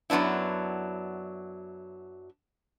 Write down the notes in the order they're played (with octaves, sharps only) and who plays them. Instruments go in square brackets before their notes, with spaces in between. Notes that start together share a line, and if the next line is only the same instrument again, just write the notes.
[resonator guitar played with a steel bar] F#2 F#3 B3 D4 E4